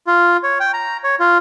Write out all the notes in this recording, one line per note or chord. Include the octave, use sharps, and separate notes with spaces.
F4
C#5
G5
A#5
C#5
F4